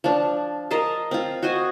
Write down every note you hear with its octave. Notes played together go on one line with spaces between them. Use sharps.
F3 D4
A#4 D#5 F5 A5
C4 F4
F#4 C5 D#5 G#5